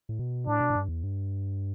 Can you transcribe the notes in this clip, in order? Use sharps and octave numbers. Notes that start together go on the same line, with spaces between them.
A2
B2
A2 D4
B2
A2
G2
E2
G2